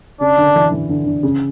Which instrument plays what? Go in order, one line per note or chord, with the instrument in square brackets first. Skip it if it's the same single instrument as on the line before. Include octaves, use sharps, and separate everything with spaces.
[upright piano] C#3 [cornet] D4
[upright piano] D3
E3
E3
D3
D3
C#3